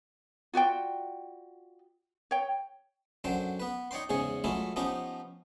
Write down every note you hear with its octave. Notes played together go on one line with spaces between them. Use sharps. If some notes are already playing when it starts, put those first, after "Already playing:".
F4 F#4 D5 G5
C#5 G5
F#2 D3 F#3 C5 G5
B3 B4
D#4 C#5 D5 G5 C6
E2 G#2 C#3 G#4 C#5
E3 F#3 G#3 A3 E4 F4
F3 B3 C#4 D#4 G4